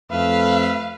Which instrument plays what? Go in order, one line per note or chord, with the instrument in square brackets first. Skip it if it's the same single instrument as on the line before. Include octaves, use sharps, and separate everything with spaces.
[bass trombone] F2 [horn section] A3 B4 E5 [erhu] F5